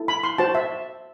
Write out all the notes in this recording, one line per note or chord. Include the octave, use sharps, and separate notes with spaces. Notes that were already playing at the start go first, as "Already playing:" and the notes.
Already playing: E4 A4
B5
C6
F#4 C5 A5
E5